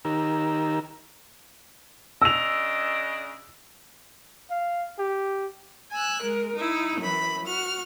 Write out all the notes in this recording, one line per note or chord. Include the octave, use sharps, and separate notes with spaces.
D#3 D#4 G4 A#4 A#5 E6
C#3 D4 D#5 E6 F7
F5
G4
G#5 E6 F#6
G#3 A#4
D#4 E4
F#2 E3 B5
F#4 F6